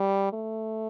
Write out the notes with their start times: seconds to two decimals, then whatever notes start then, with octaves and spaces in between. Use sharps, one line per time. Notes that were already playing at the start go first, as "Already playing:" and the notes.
Already playing: G3
0.33 A3